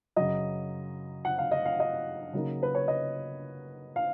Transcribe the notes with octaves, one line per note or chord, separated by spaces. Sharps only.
F#2 C#3 F#3 D#5
F#5
F5
D#5
F5
D#5
C#3 F#3 A#3 D#4
B4
C#5
D#5
F5